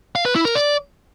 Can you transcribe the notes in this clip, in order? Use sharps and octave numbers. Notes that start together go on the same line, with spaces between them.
F5
B4
E4
A#4
D5